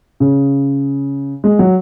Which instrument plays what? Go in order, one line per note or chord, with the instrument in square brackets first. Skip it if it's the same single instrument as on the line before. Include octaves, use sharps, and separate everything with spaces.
[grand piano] C#3
G#3
F#3